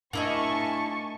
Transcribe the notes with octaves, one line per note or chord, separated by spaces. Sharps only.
A2 A#3 D4 E4 D#5 G#5 A5 C#6